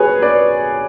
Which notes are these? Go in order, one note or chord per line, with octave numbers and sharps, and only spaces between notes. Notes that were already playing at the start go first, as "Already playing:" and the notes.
Already playing: F#4 G#4 B4 C#5
B4 D5